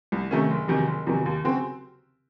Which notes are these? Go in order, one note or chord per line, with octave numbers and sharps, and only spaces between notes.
C2
C3 D#3 A3 C#4
F#1
E2 C3 D#3 F#3
F#1
E2 C3 D#3 F#3
D#2
C#3 F#3 C4 F#4